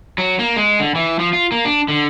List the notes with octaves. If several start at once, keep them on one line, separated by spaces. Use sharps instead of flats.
F#3
A#3
G#3
D3
E3
F3
F4
A#3
D4
D3